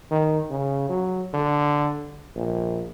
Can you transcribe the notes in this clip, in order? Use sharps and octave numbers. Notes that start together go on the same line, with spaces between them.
D#3
C#3
F#3
D3
A#1